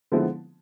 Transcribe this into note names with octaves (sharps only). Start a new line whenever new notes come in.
D3 F3 G#3 B3 E4